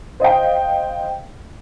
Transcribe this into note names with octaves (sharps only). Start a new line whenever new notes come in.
C5 D#5 F5 G5